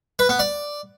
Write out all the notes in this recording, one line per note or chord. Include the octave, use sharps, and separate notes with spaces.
B4
B3
D5